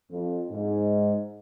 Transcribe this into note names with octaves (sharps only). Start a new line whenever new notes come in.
F2
G#2